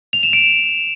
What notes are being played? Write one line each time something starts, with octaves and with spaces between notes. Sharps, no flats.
F7
E7
D7